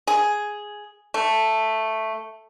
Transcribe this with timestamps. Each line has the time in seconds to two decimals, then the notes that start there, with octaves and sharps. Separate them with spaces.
0.07 G#4
1.14 A3